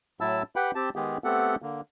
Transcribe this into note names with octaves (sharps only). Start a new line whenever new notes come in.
A2 F#3 E4 A5 E6
G4 B4 F#5 G5 B5
C4 G4 A5
D#3 G#3 B3 G4 G#4
A3 B3 C4 G4 A4 F#5
D3 A#3